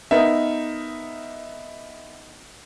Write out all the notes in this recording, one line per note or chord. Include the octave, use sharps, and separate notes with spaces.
B3 D#4 A#4 E5